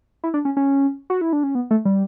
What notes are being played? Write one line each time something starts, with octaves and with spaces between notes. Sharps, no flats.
E4
D4
C#4
C#4
F#4
E4
D4
C#4
B3
A3
G3